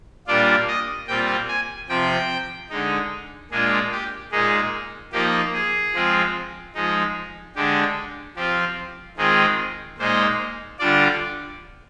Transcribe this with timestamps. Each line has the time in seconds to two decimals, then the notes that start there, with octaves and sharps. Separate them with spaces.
0.27 A#2 G3 D4 F4 D5
0.68 D#5
1.08 A#2 G3 C4 F4 G5
1.48 G#5
1.89 C3 F3 C4 G5
2.70 D3 G#3 D#4
3.51 A#2 G#3 D4 F4 G#4
3.92 G4
4.32 A#2 G#3 D#4 G#4
5.12 F3 A#3 D#4 G4
5.53 G#4
5.94 F3 G#3 C4 F4
6.75 F3 G#3 D#4
7.55 D3 G#3 D4 G4
8.36 F3 C4 F4 G4
9.17 D#3 G#3 C4 F4 G#4
9.98 A#2 G#3 D#4 C5
10.79 D3 G3 D4 F4 D5